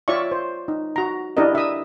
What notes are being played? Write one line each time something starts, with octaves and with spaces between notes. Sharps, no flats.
F4 C#5 D5 E5 C#6
C5
D#4
F#4 A#5
D4 E4 G4 A#4 D#5
E5 D#6